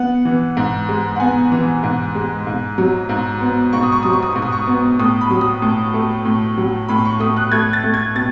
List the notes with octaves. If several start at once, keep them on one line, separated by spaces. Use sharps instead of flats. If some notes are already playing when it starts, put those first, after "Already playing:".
Already playing: B3 F#5
E3
G#2
G#3
F#5
B3 G#5
E3
G#2
G#3
G#2
F#3
G#2
B3
G#2 C#6
D#6
C#6
F#3 D#6
C#6
D#6
G#2 C#6
D#6
C#6
B3
A2 D#6
B5
F#3
D#6
A2
A3
A2
F#3
A2 B5
C#6
A3 D#6
F#6
A3 G#6
A6
A3
G#6
B2 A6